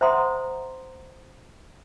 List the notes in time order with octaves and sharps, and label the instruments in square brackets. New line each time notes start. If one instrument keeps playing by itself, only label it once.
[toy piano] C5 E5 F#5 A#5 C6 D#6